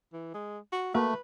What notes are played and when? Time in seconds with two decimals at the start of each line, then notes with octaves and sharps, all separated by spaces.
0.13 E3
0.34 G#3
0.72 F#4
0.94 A3 A#3 F#4 B4 E5